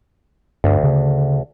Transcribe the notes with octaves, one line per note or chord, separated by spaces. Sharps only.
D2 G2
C#3